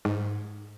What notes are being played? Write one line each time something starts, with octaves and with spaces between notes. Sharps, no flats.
G#2